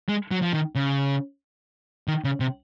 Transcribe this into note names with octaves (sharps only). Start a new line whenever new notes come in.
G#3
F#3
F3
D#3
C#3
D#3
C#3
C3